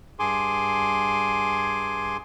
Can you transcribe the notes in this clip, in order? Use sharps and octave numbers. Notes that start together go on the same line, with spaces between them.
G2 G#4 G#5 C6 D6